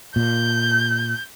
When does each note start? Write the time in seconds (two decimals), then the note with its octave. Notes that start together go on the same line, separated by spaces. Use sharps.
0.16 A#2 G6